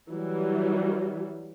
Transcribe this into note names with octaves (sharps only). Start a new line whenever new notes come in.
E3 F#3 G3